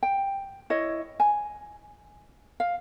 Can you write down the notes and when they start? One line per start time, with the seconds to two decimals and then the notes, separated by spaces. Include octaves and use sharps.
0.03 G5
0.70 E4 C#5 D#5
1.20 G#5
2.60 F5